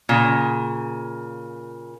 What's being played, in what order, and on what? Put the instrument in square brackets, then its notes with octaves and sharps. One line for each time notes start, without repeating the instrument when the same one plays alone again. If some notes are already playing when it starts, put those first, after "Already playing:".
[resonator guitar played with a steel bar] A#2 C#3